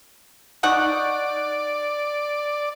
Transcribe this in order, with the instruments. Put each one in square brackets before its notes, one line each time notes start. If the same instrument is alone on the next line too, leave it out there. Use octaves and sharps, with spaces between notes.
[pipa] D#4 F#5 C#6 [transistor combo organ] D5